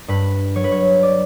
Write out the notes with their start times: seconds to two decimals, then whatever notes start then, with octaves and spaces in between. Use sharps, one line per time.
0.08 G2 B4
0.55 F#3 C#5
0.64 B4
0.72 C#5
1.03 D5